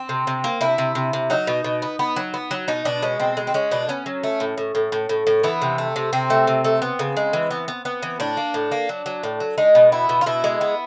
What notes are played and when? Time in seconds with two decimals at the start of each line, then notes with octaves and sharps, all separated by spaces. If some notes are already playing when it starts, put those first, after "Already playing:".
Already playing: C4
0.09 C3
0.27 C3
0.44 A#3
0.61 C3 E4
0.78 C3
0.95 C3
1.13 C3
1.30 F#3 D#4
1.47 B2
1.64 B2
1.82 B3
1.99 B3
2.16 F#3
2.34 B3
2.51 F#3
2.68 B2 D#4
2.85 B2 D4
3.02 G#3 C#4
3.20 B2 C4
3.37 G#3
3.47 C4
3.54 G#3 C#4
3.71 B2 D4
3.89 B3 C#4
4.06 F#3
4.23 A3
4.40 A2
4.58 A2
4.75 A2
4.92 A2
5.09 A2
5.27 A2
5.43 E3 B3
5.62 C3
5.78 A3
5.96 C3
6.13 C3 C4
6.30 A3
6.47 C3
6.64 A3
6.82 B3
6.99 C#3
7.17 G#3
7.33 E3
7.51 B3
7.68 B3
7.85 B3
8.03 E3
8.20 A2 D4
8.37 A#3
8.54 A2
8.72 A#3
8.89 F#3
9.06 F#3
9.23 A2
9.40 F#3
9.58 G#3 D#4
9.75 B2
9.92 B3 E4
10.09 B2
10.21 F4
10.26 B2 E4
10.44 G#3
10.61 B3